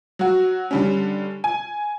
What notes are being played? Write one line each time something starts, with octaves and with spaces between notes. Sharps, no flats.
F#3 F#4
D3 G3 C#4
G#5